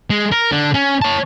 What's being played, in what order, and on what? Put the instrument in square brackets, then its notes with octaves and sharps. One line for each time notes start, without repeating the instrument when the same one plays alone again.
[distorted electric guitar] G#3
A#4
D3
C#4
C#5 A5